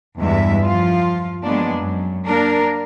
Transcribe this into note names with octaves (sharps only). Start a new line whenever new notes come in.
E2 G2 G#3 E5
F3 F4
F3 F#3 G#3 A#3 B3 D4
F#2
A#3 D4 A#4